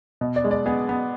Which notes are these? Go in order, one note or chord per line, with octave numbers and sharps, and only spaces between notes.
B2
D5
G#3
D5
B3 G#4
B3